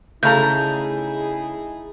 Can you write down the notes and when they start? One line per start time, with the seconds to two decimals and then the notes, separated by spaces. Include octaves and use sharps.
0.23 C#3 A3 D#4 E4 G#4 A4 A#5 G6